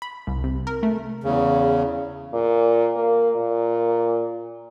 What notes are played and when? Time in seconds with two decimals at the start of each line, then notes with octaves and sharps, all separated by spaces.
0.02 B5
0.27 C2
0.44 C3
0.67 A#4
0.83 A3
1.24 E2 C#3
2.33 A#2
2.96 A#3
3.36 A#2